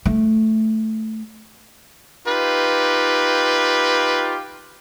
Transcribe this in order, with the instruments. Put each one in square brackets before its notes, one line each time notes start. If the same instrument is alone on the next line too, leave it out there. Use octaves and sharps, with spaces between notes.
[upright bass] A3
[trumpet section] D#4 F4 G4 B4